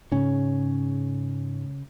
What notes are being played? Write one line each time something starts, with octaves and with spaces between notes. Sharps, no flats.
G#2 C#3 C#4